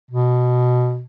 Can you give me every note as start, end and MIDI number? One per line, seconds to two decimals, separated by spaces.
0.11 1.04 47